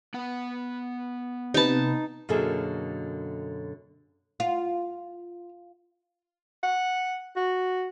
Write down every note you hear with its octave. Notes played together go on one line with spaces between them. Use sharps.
B3 F#5
C3 D#4 B4 A5
F#2 B2 D3 A#3 G#4 A4
F4
F#5
F#4